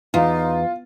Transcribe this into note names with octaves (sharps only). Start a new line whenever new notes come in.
E2 D#4 F4